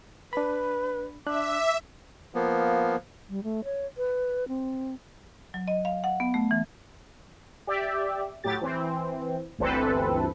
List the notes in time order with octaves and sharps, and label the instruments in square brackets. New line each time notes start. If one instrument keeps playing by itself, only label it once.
[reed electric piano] D4 B5 [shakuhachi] B4
[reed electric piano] D4 F#6 [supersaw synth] E5 [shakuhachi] D6
[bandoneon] F3 A#3 B3
[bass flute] G3
A3
C#5
B4
C4
[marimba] F#3
D#5
F5
F#5
B3
A3
E3
[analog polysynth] G4 D5 E5
A2 F#3 G4 A6
E3 C4
G1 D2 E3 C4 A4 B4